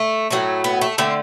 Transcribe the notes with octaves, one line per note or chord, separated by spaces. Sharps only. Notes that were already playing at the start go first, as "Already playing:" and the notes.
Already playing: A3
A2 F#3 A3
B3
A3
D3 A3 C4